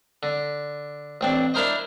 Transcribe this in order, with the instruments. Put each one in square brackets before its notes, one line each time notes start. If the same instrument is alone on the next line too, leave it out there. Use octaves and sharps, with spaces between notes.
[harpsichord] D3
A1 C4 D4
D4 E4 A#4 C5 D#5